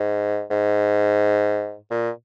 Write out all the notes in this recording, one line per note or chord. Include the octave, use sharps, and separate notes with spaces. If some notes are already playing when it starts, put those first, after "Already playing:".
Already playing: G#2
G#2
A#2